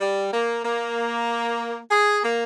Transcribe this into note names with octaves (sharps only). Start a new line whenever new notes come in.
G3
A#3
A#3
G#4
A#3